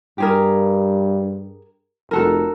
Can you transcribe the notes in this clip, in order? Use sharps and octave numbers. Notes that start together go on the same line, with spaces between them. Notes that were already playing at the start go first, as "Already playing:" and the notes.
G2 G4 G#4 A#4
F1 F#4 A4 A#4